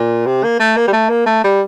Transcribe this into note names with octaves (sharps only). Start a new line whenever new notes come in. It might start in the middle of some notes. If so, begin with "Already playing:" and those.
Already playing: A#2
C3
A#3
A3
A#3
G3
A3
A#3
A3
G3